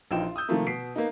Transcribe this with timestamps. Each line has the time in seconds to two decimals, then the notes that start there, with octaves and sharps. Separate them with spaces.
0.11 A#1 E3 D#4 F4 G5 E7
0.23 F4
0.36 D#6 E6 G6
0.49 C3 D#3 F3 A3 A#3
0.67 B2 B6 C7 D7
0.96 A#3 B3 D#4